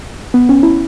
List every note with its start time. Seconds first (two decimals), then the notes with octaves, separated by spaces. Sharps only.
0.34 B3
0.49 C#4
0.63 E4